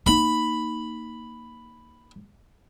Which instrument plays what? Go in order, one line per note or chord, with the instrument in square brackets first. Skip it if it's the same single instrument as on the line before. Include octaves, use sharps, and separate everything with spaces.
[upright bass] A#3 D#4 [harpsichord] B5